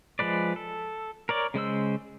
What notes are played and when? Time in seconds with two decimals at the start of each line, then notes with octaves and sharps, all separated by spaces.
0.19 F3 G#3 B4 D5
0.56 A4
1.29 A#4 C#5 D5
1.54 C#3 G#3 C5 E6